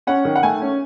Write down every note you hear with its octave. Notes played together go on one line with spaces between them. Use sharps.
C#4 F#5
D#3
F#5
A3 G#5
C#4